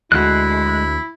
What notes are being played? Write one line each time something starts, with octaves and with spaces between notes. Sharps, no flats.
D2 G#3 E4 F#4 F#6